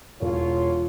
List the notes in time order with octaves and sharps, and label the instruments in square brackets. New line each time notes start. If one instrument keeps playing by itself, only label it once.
[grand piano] E1 [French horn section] F4 C#5